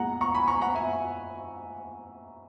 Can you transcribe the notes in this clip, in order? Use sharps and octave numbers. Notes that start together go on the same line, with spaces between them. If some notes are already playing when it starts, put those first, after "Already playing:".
Already playing: A#2 G#3 B3 F#5 A#5
A#5 C#6
G#5 B5
A#5 C#6
F#5 A#5
E5 G#5